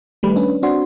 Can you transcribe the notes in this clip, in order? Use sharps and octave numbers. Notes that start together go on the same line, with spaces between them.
D#3 G3 A3 B4
C#4 D4 B4
C4 D4 F#4 C6